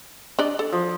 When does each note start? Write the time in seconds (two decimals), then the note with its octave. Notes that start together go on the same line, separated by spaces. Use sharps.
0.39 D4 D5 D#5
0.59 A4
0.72 F3